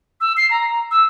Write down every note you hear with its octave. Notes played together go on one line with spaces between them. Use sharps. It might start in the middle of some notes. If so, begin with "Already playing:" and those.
E6
C7
A#5
E6